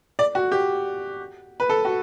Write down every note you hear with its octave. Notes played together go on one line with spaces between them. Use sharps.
D5
F#4
G4
B4
A4
F#4